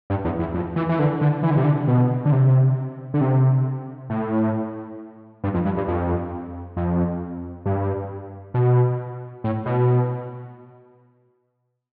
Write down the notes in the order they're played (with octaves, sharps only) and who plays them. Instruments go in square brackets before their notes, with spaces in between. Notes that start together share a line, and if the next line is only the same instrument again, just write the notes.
[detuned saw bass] G2
E2
E2
F2
E3
E3
D3
D3
E3
D3
C3
D3
B2
D3
C3
D3
C3
A2
G2
F2
G2
G2
F2
F2
G2
B2
A2
B2